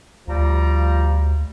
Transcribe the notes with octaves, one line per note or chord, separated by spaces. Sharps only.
D2 F3 G3 A#5